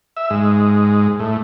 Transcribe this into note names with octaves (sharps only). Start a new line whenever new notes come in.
E5
G#2
A2